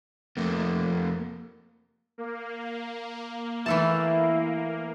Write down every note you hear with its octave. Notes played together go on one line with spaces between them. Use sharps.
F2 A3 A#3
A#3
E3 A3 E4 A5